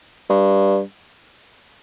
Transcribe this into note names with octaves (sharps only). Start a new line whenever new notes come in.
G2